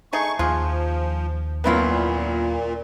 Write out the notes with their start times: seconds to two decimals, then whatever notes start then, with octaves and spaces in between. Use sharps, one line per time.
0.13 A3 D#4 G#4 C#6
0.39 D#2 F3 F4 G#4
1.64 F#2 A#2 D#3 B3 E4 F4